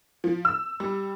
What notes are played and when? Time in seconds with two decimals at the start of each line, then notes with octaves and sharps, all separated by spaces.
0.24 F3
0.45 E6
0.80 G3